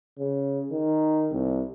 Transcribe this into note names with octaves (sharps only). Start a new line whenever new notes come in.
C#3
D#3
C2